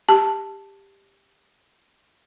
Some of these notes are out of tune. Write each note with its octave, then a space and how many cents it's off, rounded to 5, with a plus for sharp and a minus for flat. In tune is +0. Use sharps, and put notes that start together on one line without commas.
G4 +10 A5 +0